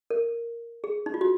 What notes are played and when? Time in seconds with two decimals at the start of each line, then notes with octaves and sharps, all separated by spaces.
0.10 A#4
0.84 G#4
1.06 D#4
1.14 F4
1.21 F#4